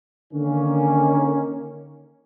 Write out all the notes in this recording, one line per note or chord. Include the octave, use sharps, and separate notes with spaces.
D3 D#3 A#3 C#4